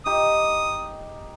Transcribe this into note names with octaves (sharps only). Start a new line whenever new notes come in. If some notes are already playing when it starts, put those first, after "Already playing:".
D#4 G4 D#6